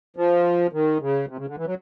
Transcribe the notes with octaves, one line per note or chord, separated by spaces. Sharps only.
F3
D#3
C#3
C3
C#3
D3
E3
F#3